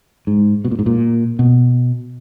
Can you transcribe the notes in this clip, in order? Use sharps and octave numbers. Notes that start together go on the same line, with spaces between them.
G#2
B2
A#2
G#2
A#2
B2